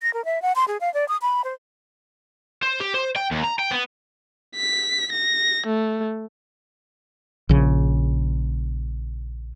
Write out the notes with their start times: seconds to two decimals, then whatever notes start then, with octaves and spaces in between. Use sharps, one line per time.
0.02 A#6
0.14 A#4
0.25 E5
0.42 F#5
0.56 C6
0.68 G#4
0.81 F5
0.94 D5
1.08 D#6
1.22 B5
1.44 C5
2.63 C5
2.80 G4
2.94 C5
3.16 G5
3.32 D#2
3.44 A#5
3.59 G5
3.71 B3
4.56 B6
5.13 A#6
5.67 A3
7.49 A#1 C#3